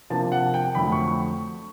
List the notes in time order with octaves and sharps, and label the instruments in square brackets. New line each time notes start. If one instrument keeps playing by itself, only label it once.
[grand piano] C3 F3 A#3 D4 A5
F#5
G5
F2 D3 F#3 A3 B5
C#6
C#6